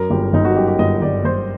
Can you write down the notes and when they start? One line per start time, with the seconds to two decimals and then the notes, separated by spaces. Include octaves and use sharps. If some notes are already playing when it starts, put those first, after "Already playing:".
Already playing: F#2 A#4
0.10 G1 G4
0.33 G1 D#4
0.45 F#4
0.56 F#2 G4
0.67 G4
0.79 G1 D#5
1.02 G1 D5
1.24 G1 C5